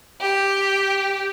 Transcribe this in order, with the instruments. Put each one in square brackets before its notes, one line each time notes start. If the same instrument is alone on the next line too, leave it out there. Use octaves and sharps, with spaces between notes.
[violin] G4